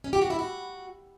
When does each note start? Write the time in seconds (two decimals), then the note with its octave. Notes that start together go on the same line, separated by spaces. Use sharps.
0.04 C#4
0.13 G4
0.22 F#4
0.30 E4
0.39 F#4